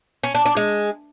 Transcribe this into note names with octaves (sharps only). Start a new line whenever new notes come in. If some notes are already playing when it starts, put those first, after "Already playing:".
C#4
D4
D4
G#3